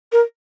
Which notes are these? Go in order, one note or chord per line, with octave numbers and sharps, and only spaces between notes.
A#4